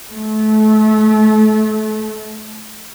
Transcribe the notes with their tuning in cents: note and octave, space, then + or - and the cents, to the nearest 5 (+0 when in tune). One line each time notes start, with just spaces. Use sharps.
A3 -30